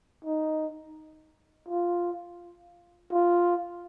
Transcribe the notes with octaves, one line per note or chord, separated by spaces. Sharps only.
D#4
F4
F4